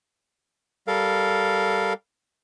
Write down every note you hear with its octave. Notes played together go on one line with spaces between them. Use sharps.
G3 A4 A#4 F5